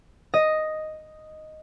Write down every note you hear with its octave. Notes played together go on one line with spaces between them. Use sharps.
D#5